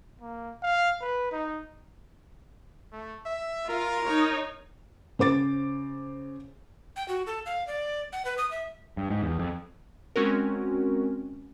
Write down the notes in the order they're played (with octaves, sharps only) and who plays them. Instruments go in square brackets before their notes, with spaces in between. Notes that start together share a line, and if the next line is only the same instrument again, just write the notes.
[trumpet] A#3
F5
B4
D#4
[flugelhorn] A3
E5
[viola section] F4 [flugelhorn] A#4
[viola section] D#4 C#5
[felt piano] C#3 C5 D6 A6
[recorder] G5
F#4
A4
F5
D5
F#5
B4
D#6
E5
[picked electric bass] G2
G#2
E2
F2
[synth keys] G#3 C4 C#4 F#4 A#4